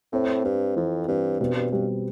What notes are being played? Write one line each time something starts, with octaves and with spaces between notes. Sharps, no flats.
A2 C4
G2 C4
F2 E3
G2 C4
G2 B2
G2
G2 G3